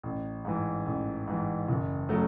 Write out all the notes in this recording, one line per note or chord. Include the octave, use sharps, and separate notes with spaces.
A1
G#2 E3
A1
G#2 E3
F#1
C#3 F#3 A3